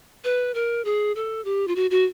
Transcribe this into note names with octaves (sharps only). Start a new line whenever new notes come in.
B4
A#4
G#4
A4
G4
F4
F#4
F#4